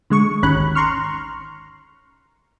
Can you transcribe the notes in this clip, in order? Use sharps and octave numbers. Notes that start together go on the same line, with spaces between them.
D3 G#3 C#6
G#1 D#2 D#3 C#4 B5 F#6
A#5 C6 C#6 F6